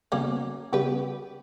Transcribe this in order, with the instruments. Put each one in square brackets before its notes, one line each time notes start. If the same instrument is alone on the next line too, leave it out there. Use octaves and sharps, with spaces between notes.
[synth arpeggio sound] C#3 G3 B3 F#4 [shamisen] A#3 C#4
[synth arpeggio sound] C#3 G3 B3 F#4 [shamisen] G4 B4